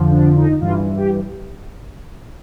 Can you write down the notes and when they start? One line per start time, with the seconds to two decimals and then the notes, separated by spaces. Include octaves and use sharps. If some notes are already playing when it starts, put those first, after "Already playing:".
Already playing: F2 D3 F3
0.12 D4
0.37 D#4
0.61 G2 E3 F4
0.97 G4